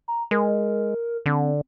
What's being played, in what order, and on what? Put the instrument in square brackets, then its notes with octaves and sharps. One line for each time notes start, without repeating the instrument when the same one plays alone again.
[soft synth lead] A#5
[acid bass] G#3 [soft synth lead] A#4
[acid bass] D3 [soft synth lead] C4